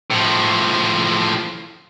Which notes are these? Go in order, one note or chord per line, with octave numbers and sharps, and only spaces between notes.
A2 F3